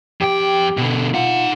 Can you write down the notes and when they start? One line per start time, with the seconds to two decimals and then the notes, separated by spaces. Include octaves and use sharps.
0.21 F2 G4 G5
0.77 B2 D3
1.14 D#4 F4 F#5